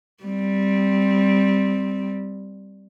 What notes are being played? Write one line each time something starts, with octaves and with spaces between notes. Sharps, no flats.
G3 C4